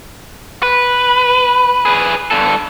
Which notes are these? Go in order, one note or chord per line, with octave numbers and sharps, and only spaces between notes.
B4
G#4 B4
G2 A4